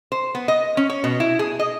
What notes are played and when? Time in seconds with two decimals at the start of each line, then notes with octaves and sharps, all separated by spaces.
0.12 C5
0.35 B3
0.48 D#5
0.77 C#4
0.90 C#5
1.04 B2
1.20 E4
1.39 G#4
1.59 D#5